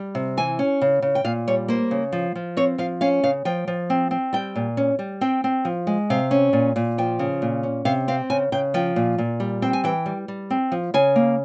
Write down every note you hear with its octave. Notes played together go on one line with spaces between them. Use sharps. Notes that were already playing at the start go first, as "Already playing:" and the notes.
Already playing: G3
C3
E3 G#5
C#4
C#3
C#3
G5
A#2 F5
G3 C#5
A#3 C5
C#3
F3
F3
C4 C#5
F3 F5
C#4 F5
C#3 F5
F3 G5
F3
C4
C4
G3 G5
A#2
C#4
G3
C4 G5
C4
F3
G#3
C3 F5
C#4
A#2
A#2
F3 G5
C#3
A#2
C#4
C3 F5
C4 F5
C#3 G#5
C#3 G5
F3 G5
A#2
A#2
G3
C4 G5
G#5
E3 G5
G3
G3
C4
F3
C#3 G#5
A#3